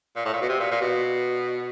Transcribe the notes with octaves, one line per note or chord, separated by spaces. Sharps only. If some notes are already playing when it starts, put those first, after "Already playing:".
A#2
A2
A#2
B2
C3
A#2
A#2
B2